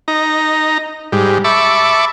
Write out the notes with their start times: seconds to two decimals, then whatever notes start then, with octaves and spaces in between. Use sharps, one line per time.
0.08 D#4 A#5
1.12 G#2 G3
1.44 E5 A5 B5 C#6 D6